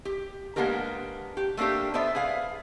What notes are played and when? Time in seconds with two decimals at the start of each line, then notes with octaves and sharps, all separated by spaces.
0.05 G4
0.56 G#3 A#3 B3 D4 G4 A#4
1.37 G4
1.57 A3 A#3 C#4 D4 G4
1.94 B3 A4 C5 D5 E5
2.15 G#4 B4 F5